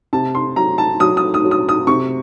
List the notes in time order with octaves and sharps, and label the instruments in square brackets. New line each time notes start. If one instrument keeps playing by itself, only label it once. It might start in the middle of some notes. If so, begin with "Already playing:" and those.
[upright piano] C3 A5
C6
F#3 A#5
A5
F#3 D#6
D#6
D#6
F#3
D#6
D#6
C3 C#6